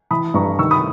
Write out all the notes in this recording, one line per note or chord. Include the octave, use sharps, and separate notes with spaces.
E3 B5 D#6
G2 A#5 C#6
D#3 C#6 E6
B5 D#6